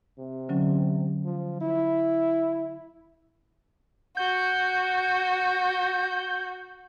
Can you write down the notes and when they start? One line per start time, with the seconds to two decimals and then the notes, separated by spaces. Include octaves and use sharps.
0.19 C3
0.49 D3 F#3 C#4
1.25 F3
1.61 E4
4.17 F#4 G6